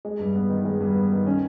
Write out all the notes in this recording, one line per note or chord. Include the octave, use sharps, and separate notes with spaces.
G#3
G2
B3
D#3
G#3
G2
B3
D#3
C#4